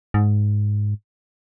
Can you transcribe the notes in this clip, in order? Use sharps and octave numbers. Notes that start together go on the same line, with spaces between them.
G#2